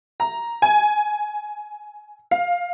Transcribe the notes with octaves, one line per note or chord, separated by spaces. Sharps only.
A#5
G#5
F5